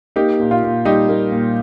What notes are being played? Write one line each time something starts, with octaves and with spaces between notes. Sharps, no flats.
A#3 D#4 G4
A#2
F4
A#2
G3 D#4 G4
A#3
A#2